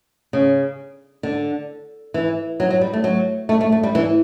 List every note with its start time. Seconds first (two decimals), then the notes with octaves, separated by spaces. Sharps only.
0.33 C#3
1.23 D3
2.14 E3
2.60 F#3
2.70 F#3
2.81 G3
2.93 A3
3.04 F#3
3.49 A3
3.61 A3
3.72 A3
3.83 G3
3.95 E3